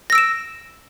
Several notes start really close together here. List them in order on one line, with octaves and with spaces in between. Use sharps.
A#6 E6 D7 E7